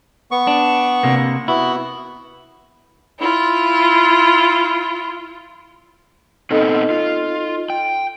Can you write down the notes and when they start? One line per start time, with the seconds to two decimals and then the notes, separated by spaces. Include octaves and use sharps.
0.31 B3 C#6
0.47 D4
1.03 C3 A#3
1.48 B3 E4 F#4
3.20 E4 F4
6.51 A#2 B3 C4 D#4 A4 D#5
6.90 F4
7.70 G5